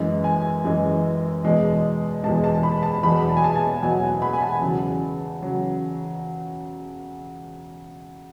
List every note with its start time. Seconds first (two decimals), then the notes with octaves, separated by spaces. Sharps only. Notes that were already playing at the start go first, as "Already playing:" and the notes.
Already playing: F#2 E3 G#3
0.24 G#5
0.64 F#2 E3 G#3
1.44 E2 B2 G#3
2.24 E2 B2 G#3 A5
2.44 A5
2.63 B5
2.83 A5
3.03 E2 B2 F#3 B5
3.29 A5
3.37 G#5
3.44 A5
3.55 A5
3.82 E2 B2 F#3 G#5
4.02 F#5
4.22 B5
4.33 G#5
4.42 A5
4.62 E2 C#3 F#3
5.42 C#3 F#3